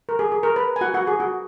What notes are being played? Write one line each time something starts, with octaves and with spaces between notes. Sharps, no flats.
A#4
G#4
G#4
A#4
B4
G#5
F#4 F#5
F#4 F#5
G#4
F#4